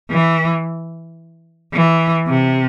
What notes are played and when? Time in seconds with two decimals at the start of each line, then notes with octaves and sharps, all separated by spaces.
0.10 E3
1.73 E3
2.27 C3